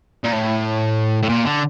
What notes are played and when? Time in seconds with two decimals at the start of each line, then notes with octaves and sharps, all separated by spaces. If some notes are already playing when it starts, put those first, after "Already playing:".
0.24 A#2
0.32 A2
1.23 A2
1.29 A#2
1.45 D3